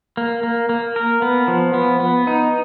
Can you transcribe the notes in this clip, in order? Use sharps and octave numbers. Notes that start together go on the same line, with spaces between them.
A#3
A#3
A#3
A#4
B3
F3
B3
B3
D#4